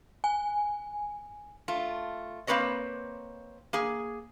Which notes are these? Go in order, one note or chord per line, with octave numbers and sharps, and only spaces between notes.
G#5
A3 F4
A#3 C4 B4 C#5 D#5
A#3 G#4